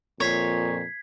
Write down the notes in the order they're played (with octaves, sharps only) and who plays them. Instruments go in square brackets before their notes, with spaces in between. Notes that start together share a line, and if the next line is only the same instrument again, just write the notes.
[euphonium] F2 [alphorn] A#2 [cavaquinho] C#5 [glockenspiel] G#6 B6 C7